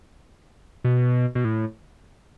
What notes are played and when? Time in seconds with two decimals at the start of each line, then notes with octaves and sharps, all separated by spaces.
0.84 B2
1.35 B2
1.44 A2